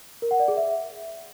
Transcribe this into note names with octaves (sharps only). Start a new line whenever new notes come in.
A#4
F#5
D5
G#4
E5